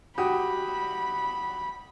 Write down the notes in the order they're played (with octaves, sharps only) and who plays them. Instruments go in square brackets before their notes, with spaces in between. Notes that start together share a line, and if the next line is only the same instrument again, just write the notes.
[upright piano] F#4 G4 D#6 [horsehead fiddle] B5